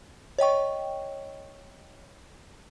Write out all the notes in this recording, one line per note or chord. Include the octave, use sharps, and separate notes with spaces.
C#5 D#5 G5 C#6